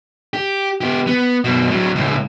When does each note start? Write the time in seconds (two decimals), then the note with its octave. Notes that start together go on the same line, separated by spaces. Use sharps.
0.34 G4
0.81 B3 G4
1.07 B3
1.44 F#2 B2
1.70 A2 F#3
1.95 C#2 A2